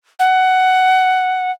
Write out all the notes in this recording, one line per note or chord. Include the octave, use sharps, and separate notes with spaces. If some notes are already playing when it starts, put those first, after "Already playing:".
F#5